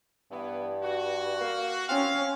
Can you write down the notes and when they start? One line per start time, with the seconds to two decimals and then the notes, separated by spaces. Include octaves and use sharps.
0.31 G2 E3 B3
0.83 F#4
1.41 A#3
1.89 C4 C#4 F5